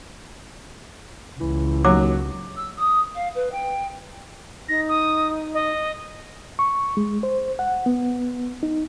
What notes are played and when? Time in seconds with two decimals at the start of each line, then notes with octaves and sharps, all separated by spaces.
1.40 C#2 E3
1.85 D#2 F#3 D6
2.56 E6
2.77 D#6
3.14 F5
3.34 B4
3.51 G5
4.69 D#4 A#6
4.88 D#6
5.54 D#5
6.59 C#6
6.97 G#3
7.23 C5
7.59 F#5
7.86 B3
8.63 D#4